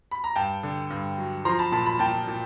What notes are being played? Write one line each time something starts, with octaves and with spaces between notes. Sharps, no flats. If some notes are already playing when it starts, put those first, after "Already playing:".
B5
A#5
G2 G5 A5
D3
G2
F#3
F3 A#5 C6
A5 B5
A#2 A5 B5
A5 B5
A#2 G5 A5
A#2